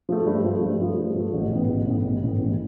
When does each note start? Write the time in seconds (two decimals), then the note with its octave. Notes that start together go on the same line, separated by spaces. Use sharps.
0.09 F3 A3
0.26 G2
0.44 F3 A3
0.62 G2
0.80 F3 A3
0.98 G2
1.16 F3 A3
1.34 A1
1.51 A2 E3 B3
1.68 A1
1.87 A2 E3 B3
2.05 A1
2.23 A2 E3 B3
2.40 A1